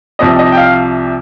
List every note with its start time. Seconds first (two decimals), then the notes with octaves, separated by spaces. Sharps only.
0.19 C2 C3 F3 D#5
0.39 D#5
0.52 G5
0.57 F5